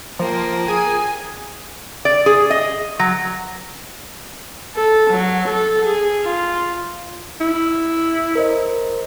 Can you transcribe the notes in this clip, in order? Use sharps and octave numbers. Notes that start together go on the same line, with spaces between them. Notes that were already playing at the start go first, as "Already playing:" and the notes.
F3 A#3 G5
G#4 G#5
D5
G#4
D#5
F#3
A4
F#3
A4
G#4
F4
E4
A#4 C5 D#5